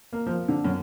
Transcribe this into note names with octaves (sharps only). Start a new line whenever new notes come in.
A#3
F3
D3
F#2